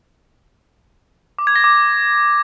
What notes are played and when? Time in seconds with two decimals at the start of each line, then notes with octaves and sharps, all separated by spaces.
1.39 D6
1.47 G#6
1.56 A#6
1.64 D6